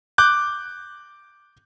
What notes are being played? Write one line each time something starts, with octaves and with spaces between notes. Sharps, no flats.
D6 F#6 G6